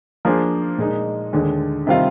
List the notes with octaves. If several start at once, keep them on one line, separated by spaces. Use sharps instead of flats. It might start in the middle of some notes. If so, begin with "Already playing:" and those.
F3 A#3 D4 G#4 C5
A#2 G#3 D#4 A#4
D#2 D3 G#3
C3 D#3 G3 C4 F4